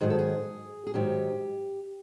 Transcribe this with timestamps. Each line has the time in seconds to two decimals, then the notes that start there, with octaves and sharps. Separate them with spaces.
0.01 G#2 D#3 F#3 G#4
0.10 A4
0.19 G#4
0.87 G#4
0.94 G#2 D#3 F#3 G4